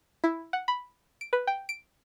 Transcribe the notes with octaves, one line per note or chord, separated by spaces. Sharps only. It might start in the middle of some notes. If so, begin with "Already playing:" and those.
E4
F#5
B5
D7
B4
G5
D7